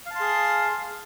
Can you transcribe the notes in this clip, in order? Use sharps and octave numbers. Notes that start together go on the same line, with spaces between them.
G#4 F5 A5 C6